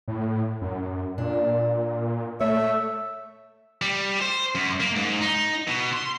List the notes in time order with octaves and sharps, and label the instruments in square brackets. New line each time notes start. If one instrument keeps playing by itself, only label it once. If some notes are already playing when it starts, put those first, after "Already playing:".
[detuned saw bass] A2
F#2
[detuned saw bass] A#2 [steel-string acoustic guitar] D4
[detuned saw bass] A3 [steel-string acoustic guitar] C#5 [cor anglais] E5
[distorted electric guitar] G3
C5
F#2
A#3
G#2
D#4
B2
C6